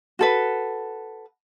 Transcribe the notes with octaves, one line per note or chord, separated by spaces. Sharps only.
F#4 A4 B4